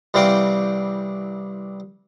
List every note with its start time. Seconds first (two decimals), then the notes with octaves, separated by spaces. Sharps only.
0.14 C2 E3 G3 C4 F5 G5